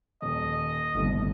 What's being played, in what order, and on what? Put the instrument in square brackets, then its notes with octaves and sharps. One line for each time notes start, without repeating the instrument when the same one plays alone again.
[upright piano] D#1 [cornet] D#5
[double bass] G1 [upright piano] D#2 A2 C3